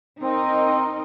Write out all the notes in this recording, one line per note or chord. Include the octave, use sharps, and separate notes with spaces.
C4 D#4 A#4 D#5